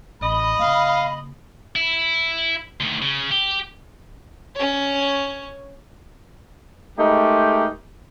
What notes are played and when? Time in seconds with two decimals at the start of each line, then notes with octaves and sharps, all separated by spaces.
0.21 A1 D#5 B5
0.59 C#3 A#3 F5
1.76 E4
2.80 D2 D#3
3.02 C#3
3.31 G4
4.56 C#4 C#5
6.98 G#3 A3 D#4 G4 A#4